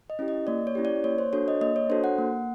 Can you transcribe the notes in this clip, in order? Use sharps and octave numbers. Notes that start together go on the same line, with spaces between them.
D#5
C#4 E4 G4
D#5
A#3 D5
C#5
C#4 E4 G4
D5
A#3 C#5
C5
D4 F#4 A4 C#5
D#5
A#3 D#5
C#5
D4 F#4 A4 C5
F#5
A#3